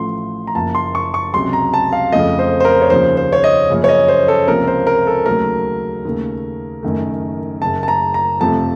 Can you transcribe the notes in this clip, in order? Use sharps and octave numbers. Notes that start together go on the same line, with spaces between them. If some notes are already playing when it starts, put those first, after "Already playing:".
Already playing: A1 A2 F3 A3 C6
A#5
F#1 F#2 F3 A#3 A5
C6
C#6
C#6
C#2 C3 F#3 C6
A#5
A5
F5
F2 C#3 F3 A3 D#5
C5
C5
A#4
C#5
D#2 C#3 F3 C5
C5
C#5
D#5
F#2 C#3 F3 A#3
C#5
D#5
C5
A4
C#2 C3 F3 A#3 A#4
C5
A#4
A4
D#2 C#3 F#3 A3 A#4
D#2 C#3 A3
F#1 F#2 D#3 A3
F#1 F#2 C#3 A5
A5
A#5
A#5
F2 C3 F3 A3 A5